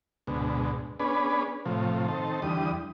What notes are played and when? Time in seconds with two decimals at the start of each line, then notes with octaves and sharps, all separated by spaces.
0.27 D2 G#2 B2
1.00 B3 C#4 D4 G#4 B4
1.65 A2 C3 F3
2.08 D#3 C4 A4
2.42 E2 D3 G3 D#6